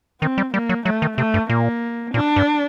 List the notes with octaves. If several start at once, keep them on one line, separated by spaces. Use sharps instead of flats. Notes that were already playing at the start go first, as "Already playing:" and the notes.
D#3 C4
G3
G3 A#3
F#3
F#3 A3
D#3
C3 A3
G2
A#2 A#3
A#2 D4
G2